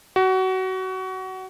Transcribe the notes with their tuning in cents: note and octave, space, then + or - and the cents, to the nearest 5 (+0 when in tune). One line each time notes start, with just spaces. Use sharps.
F#4 +25